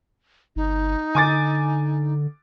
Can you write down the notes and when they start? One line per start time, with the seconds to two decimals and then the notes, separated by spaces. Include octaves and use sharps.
0.56 G1 D#4
1.15 D3 G#5 D6 A6